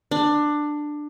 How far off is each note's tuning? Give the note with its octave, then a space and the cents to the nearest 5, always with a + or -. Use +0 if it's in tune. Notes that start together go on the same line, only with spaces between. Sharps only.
D4 +15